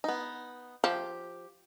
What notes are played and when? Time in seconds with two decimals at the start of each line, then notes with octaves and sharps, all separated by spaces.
0.04 B3 D#4
0.84 F3 G4